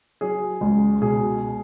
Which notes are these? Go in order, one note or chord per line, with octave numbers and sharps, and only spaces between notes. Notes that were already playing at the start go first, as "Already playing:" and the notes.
F#3 G#4
C#2
B2 G#4